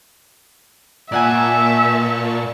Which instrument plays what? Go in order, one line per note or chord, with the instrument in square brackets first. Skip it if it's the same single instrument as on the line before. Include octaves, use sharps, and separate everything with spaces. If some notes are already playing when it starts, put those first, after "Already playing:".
[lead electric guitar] A#2 [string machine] A#3 A5 C#6 [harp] D5 F#5 G#5 [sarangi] E5